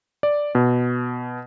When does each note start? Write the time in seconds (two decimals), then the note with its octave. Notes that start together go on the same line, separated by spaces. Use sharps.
0.23 D5
0.55 B2